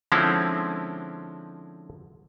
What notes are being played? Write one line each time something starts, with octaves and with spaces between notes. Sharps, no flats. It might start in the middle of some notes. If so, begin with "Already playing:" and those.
D3 F3 G#3 C4 C#4 E4